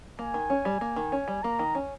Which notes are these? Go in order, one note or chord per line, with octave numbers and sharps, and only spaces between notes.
A#3 G#5
D#3
C#4
G3
A#3
D#3
C#4
G3
A#3 A#5
D#3
C#4